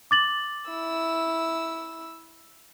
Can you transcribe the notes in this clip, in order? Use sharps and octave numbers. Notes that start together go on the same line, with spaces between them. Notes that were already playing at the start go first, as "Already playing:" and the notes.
D6 A6 F#7
E4 E6